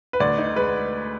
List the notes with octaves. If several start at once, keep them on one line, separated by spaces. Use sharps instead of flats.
B4
D2 D5
D#4
G#3 B4